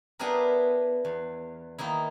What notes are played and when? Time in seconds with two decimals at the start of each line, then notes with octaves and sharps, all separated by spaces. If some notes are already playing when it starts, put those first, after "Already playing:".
0.19 B3 D4 E4 G4 G#4 A#4
1.05 E2
1.78 D#3 A#3 D#4 E4